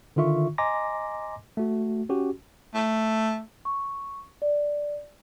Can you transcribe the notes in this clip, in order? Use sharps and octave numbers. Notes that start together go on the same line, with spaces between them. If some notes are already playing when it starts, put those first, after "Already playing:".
D3 D#3 F4 E5 C#6
D#5 G#5 A#5 C6 D6 A#6
A3 F#4
C#4 F#4 G4
A3
C#6
D5